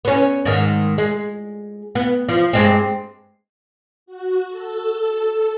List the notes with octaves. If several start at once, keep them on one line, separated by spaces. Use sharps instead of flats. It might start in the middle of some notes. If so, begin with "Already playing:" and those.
B3 C#4
G#2 D#3
G#3
B3
F3
G2 G#3 C4
F#4
A4